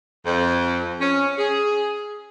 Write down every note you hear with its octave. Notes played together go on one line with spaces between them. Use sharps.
F2
C#4
G#4